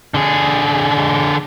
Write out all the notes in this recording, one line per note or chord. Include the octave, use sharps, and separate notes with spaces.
D3 G#4